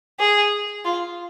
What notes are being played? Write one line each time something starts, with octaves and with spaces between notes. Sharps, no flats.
G#4
F4